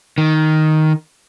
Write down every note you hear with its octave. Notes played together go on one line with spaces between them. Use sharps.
D#3